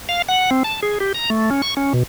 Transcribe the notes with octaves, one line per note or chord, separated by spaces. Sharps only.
F5
F#5
C4
A5
G#4
G4
A#5
A3
C#4
C#6
C#4
B2